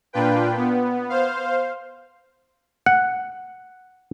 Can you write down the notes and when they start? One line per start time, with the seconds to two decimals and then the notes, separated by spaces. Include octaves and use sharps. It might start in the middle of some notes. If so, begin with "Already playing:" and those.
0.13 A#2 D4 F4 B4 G5
0.56 B3
1.09 C5 F5
2.86 F#5